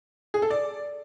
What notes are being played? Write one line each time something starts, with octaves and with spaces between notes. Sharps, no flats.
G#4
A4
D5